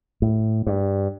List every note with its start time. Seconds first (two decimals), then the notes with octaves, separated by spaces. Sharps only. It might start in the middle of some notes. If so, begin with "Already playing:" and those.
0.22 A2
0.67 G2